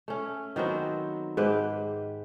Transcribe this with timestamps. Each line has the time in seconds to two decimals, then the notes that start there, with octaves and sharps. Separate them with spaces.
0.08 A3 C#4
0.56 D#3 F#3 B3 C4
1.37 G#2 G4 B4 C5